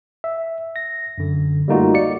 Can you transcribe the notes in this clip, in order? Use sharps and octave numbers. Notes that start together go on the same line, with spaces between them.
E5
A#6
F#2 D3
G3 A3 A#3 D#4 F4 F#4
D5 C#7